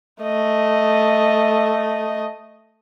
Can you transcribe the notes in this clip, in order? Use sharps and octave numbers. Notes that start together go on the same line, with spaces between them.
A3 D#5